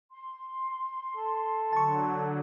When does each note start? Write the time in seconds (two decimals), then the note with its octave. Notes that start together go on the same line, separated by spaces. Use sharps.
0.11 C6
1.17 A4
1.73 D3 F#3 A5 C#6